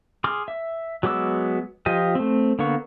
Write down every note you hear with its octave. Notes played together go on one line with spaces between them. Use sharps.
G#4 C6 D6 F6
E5
F#3 G#3 B3 D6 E6
F3 F4 G4 D#5
A3 C4
D3 A#3 B3 C#6